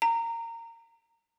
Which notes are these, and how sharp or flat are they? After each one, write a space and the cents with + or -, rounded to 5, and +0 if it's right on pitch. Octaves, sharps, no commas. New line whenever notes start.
A#5 -20